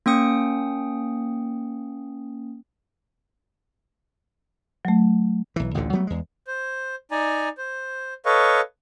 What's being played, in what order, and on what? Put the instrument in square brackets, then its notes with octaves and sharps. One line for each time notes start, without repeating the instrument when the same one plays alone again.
[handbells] A#3 C#4 G5 D#6 C#7
[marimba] F#3 A3
[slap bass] B1 E3
A1 D2 A#2 D3
F#3 G3 A3 B3
E2 G#3
[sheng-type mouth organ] C5
D#4 D5 G#5 A#5
C5
A4 B4 C#5 D#5 F5 C#6